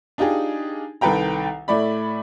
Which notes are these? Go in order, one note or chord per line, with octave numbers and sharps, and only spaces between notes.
D4 D#4 F4 G4 G#4
C2 D#3 A4 B4 G5 A#5
A2 A3 D5 B5